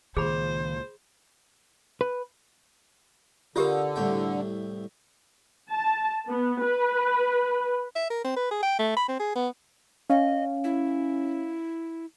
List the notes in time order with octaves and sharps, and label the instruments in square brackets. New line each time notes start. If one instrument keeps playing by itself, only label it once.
[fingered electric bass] C#2 A#2 [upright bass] D#3 [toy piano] G#4 B5 [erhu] C5
[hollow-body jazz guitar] B4
[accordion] D3 [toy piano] F4 G4 A#4 [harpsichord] D#5 F5 G5
[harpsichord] C2 A2 G5
[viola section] A5
B3
B4
[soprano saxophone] E5
A#4
C4
B4
G#4
G5
A3
B5
C4
G#4
B3
[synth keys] C#4 [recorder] D#5 [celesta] F5
[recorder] E4